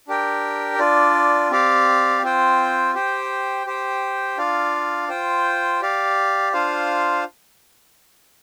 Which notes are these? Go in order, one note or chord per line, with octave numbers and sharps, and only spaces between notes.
D4 G4 A#4 G5
D4 F4 D5
C4 G4 D5 F5
C4 F4 C5 G5
G4 C5 G5
G4 C5 G5
D4 F4 D5 F5
F4 C5 G5
G4 D5 F5
D4 F4 C5 F5